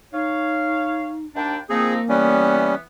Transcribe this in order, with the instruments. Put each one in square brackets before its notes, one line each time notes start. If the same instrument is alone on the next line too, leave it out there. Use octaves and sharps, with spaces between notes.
[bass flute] D#4 [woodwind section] C#5 F5
[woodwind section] D#2 D4 G5
[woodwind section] F3 C4 D#4 [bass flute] A#3 [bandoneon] G#4
[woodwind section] E3 B3 [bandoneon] G3 C#4